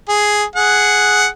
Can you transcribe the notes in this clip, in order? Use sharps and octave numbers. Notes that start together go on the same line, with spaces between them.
G#4
G#4 F#5